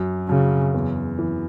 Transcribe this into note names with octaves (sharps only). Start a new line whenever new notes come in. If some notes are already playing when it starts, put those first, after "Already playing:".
Already playing: F#2
F#2 C#3
E2
E3